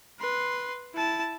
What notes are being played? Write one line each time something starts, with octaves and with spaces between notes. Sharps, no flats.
B4 C6
E4 A5